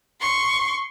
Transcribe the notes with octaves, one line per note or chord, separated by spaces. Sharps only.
C6 C#6